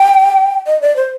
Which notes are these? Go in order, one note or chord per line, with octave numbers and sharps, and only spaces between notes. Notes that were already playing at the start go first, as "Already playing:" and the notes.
Already playing: G5
D#5
D5
C5